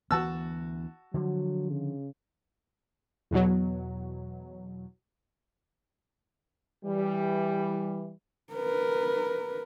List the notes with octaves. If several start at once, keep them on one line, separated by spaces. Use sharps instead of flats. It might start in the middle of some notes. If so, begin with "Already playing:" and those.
D2 E3 B3 F#4 A5 E6
D3 F3 F#3
C#3
E2 B2 F#3
E3 G3
A#4 B4